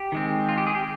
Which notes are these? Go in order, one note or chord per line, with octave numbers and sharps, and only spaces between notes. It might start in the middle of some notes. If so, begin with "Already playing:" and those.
Already playing: G4
D#3 G#3 C4
F4
G4
G#4
G4